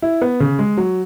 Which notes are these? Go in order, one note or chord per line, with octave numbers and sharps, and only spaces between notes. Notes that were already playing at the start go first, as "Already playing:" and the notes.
E4
B3
C#3
G#3
F#3